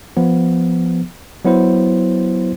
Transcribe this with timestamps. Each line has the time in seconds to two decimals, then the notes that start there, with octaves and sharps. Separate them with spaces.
0.17 F3 B3
1.45 F#3 B3 E4 C5